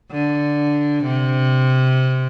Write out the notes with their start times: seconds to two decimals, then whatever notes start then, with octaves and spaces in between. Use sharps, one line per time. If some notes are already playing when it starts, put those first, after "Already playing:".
0.12 D3
1.04 C3